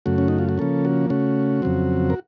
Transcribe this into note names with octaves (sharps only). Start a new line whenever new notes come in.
F#2 C#3 A3 F#4
C#4
D#4
F4
F#4
C#3 F3 A#3 C#4 A4
F#4
C#3 A3 C#4 F#4
F2 C#3 F#3 C4
A#4